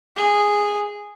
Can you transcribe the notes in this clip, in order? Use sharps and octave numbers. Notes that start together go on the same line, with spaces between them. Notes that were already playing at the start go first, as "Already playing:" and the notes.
G#4